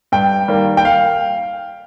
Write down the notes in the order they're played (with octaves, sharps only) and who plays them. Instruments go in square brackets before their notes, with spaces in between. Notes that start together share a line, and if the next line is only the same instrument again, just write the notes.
[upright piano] G2 G5
D#3 G3 A#3
G5
F5